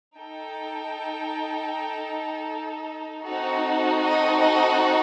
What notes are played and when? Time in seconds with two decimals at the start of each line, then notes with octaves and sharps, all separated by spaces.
0.17 D#4 A4 G5
3.24 C4 D#4 F#4 A4
4.01 D#5
4.39 D#5